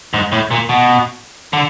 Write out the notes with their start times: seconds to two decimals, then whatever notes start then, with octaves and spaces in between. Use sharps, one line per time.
0.14 G#2
0.32 A2
0.51 A#2
0.69 B2
1.53 D3